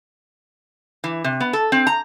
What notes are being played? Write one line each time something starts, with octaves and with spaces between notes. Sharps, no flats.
E3
C3
B3
A4
C4
A#5